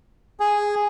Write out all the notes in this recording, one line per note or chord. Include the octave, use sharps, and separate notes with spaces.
G#4